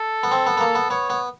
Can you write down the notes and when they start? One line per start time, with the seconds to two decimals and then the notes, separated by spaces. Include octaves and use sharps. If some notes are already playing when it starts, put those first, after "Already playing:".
Already playing: A4
0.23 B3
0.31 C4
0.47 B3
0.57 B3
0.60 A#3
0.75 B3
0.90 B3 C#5
1.10 B3